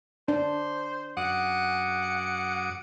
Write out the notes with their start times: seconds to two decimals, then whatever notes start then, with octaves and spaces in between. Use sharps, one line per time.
0.28 D4 C5
1.17 F#2 F#5 D6 D#6